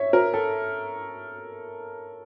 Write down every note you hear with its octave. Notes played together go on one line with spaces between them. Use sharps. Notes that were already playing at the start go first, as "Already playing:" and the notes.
Already playing: C#5 E5
A#4
A4